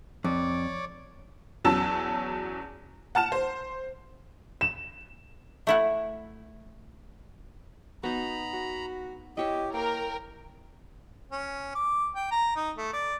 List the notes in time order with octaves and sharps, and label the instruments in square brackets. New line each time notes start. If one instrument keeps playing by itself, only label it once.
[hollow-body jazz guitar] F2 [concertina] C#5 D5 D6
[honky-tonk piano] E2 F#3 C#4 A5 E6
F#5 A5 F6 E7
C5
[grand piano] E7
[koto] A3 E4 F#5
[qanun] B3 D#4 [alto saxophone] F#4 [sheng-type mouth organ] A#5 B5
[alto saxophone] F#4
[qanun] E4 C#5 E5 [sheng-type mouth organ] G4 [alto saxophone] D#5
[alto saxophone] A#3 [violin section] A#4 [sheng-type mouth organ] G5
[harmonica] C#4
D6
G5
A#5
D#4
A3
D5